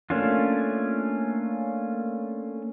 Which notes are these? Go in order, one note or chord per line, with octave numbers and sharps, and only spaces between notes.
A3 A#3 C#4 D4 F4